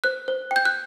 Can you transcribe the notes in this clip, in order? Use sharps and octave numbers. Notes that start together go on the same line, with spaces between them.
C5 F#6
C5
G5
G6
F#6